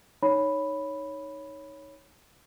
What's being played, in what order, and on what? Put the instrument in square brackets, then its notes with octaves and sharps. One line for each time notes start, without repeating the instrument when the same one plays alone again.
[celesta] D#4 C#5 B5